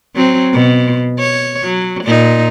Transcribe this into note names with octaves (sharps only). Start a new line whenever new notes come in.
F#3 C4
B2
C#5
F#3
A#2 D#4